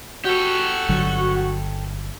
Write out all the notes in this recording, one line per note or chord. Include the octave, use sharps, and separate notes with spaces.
F#4 G4 A4
G1 D3 F#3